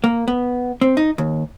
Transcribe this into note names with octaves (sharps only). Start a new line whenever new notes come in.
A#3
B3
C4
D#4
D#2